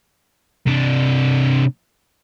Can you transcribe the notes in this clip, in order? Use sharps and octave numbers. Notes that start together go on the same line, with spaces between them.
C3 D4